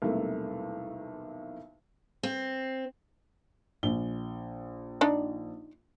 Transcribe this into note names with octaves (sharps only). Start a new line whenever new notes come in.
B1 E2 C3 G3 A3 A#3
C4
A#1 G7
D4 D#4 D5